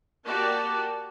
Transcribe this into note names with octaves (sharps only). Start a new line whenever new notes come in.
A#3 F#4 G4 D5 A5